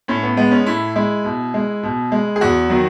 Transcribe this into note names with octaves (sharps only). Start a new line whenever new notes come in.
A2 C#4
B3
G#3 B3
C#4
A2 E4
G#3 E4
B2
G#3
B2
G#3
G#4
E2 F#4
D#3 F#3